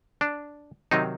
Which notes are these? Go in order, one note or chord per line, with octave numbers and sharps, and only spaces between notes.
D4
C3 D#3 F#3 C4 D#4